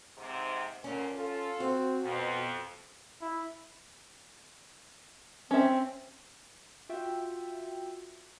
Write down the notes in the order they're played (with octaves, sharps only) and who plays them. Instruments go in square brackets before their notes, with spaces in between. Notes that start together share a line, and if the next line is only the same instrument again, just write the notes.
[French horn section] G#2 C3
[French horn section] D2 A#2 [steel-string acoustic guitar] C#4
[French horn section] F4 A4
[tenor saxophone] C4 [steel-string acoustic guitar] F#4
[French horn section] F2 [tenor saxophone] B2
[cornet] E4
[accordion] C4 [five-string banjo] C#4 E5
[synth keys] F4 F#4 E5 G5